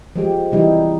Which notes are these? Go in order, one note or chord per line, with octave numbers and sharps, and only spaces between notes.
F3 G#3 G4
C3 E3 G3 D#4 E4 G4